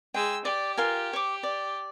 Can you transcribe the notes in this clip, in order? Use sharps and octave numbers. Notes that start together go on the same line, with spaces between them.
G#3 G5 E6
G4 D5
F4 A#4 G#5
C#5 D6
D5